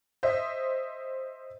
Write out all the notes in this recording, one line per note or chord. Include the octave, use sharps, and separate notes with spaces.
C5 D#5 E5